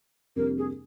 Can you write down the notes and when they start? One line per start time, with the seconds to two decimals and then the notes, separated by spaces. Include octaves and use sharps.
0.36 F2 C3 G3 A#3 D4 A#4
0.58 G#4